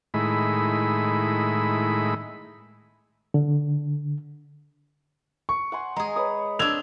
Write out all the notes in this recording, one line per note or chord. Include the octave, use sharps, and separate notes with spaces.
A2 D#3 G#3 E4 B5
D3
C#6
F#5 G#5 C6
G#3 G#4 A#5
B4 C#5 D#6
C4 D4 E6 G#6 F7